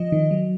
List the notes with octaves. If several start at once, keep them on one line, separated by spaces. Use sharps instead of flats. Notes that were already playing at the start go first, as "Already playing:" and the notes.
Already playing: F3 D#5
D#3
F#3